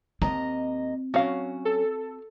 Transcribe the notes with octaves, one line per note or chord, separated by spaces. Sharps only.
D#2 C4 D#5 A#5
F#3 C#4 F#4 F5
A4